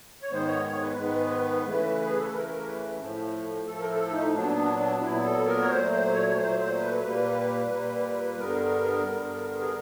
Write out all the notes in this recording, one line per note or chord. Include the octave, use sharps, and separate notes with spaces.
C#5
G#2 D#3 G#3 B3 C5
C#5
C#5
B4
G#2 D#3 G#3 B3
C#3 E3 A3
G#4
A4
C#3 E3 A3 A#4
A#4
B4
A2 F3 A3
A2 F3 A3 A4
A#4
A4
D#4
A#2 F#3 B3 D4
D4
D4
A#2 F#3 B3 E4
A4
A#4
C#5
A#2 F#3 A3 C5
C5
C#5
C#5
A#2 F#3 A3 C5
C5
B4
A#2 G3 A#3
A#2 G3 A#3
G2 D3 G3 B3 A#4
G2 D3 G3 B3
G#4